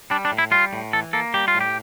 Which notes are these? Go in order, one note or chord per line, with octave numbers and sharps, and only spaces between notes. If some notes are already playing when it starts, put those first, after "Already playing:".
G3 D4
D4
A2
E4
G3 F4
A2
E3 A4
A#3 A4
G3 G4
F4
A2
G4